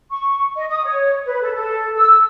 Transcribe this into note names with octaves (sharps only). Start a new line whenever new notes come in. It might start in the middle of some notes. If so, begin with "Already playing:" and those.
C#6
D#5
D#6
C#5
B4
A4
A4
E6